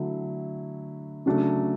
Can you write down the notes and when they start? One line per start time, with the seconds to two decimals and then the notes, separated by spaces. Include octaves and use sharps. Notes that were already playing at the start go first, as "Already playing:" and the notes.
Already playing: D3 F#3 A3 E4
1.26 C#3 F#3 A3 D4